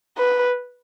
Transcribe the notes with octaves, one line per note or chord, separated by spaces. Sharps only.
B4